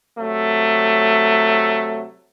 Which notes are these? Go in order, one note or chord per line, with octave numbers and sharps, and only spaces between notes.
C3 F#3 A3